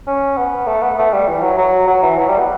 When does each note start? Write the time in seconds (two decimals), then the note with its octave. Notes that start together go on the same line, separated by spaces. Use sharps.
0.07 C#4
0.37 B3
0.67 A3
0.82 B3
0.98 A3
1.13 G3
1.27 E3
1.42 F#3
1.58 F#3
1.87 F#3
2.03 E3
2.18 F#3
2.28 G3
2.38 B3